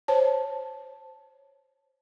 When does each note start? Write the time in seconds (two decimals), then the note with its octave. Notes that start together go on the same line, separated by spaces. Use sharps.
0.08 C5 C#5 A5